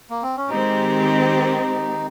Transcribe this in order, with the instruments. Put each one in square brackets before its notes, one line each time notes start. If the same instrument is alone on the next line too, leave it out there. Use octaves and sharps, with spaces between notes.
[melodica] A#3
C4
C#4
[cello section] D#3 G#3 C4 G4 [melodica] D#4